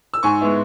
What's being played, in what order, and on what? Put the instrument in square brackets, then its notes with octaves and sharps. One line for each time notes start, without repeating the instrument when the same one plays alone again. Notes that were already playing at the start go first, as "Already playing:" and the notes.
[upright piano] E6
G#2 G#5 C#6
G#3 B3 E4